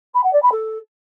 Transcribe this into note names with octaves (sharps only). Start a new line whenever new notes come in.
B5
F#5
D5
B5
A4